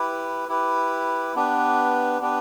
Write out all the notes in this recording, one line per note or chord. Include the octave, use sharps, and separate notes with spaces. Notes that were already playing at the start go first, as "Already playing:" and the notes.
Already playing: E4 G4 B4
E4 G4 B4
B3 D4 G4 B4
B3 D4 G4 B4